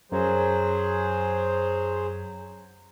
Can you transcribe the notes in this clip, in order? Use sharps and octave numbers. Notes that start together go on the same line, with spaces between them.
F#2 F#3 G#4 C5